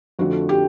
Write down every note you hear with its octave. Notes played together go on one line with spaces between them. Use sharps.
F2 D3 F3 A3 F#4
G4